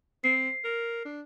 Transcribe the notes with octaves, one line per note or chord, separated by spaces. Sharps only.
C4 C7
A#4
D4